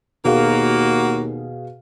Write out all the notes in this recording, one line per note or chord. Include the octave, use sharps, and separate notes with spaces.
D#2 B2 A#3 F#4 G#4 F5